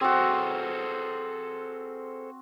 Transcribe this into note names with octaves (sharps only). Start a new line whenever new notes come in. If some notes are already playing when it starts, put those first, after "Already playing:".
C4 F#4 G#4 A4 C5